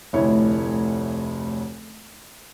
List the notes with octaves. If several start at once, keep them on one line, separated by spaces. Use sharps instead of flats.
F1 D2 E4 C#5